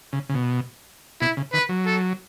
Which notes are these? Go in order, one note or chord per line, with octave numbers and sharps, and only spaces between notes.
C#3
C#3
B2
B2 E4
C#3
D#3 B4
F#3
A4